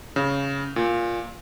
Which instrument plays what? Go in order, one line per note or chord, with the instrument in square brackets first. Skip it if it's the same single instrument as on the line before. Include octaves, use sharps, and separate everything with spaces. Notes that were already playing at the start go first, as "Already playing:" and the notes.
[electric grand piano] C#3
A#2